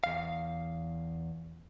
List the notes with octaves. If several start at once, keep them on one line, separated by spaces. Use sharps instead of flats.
E2 F5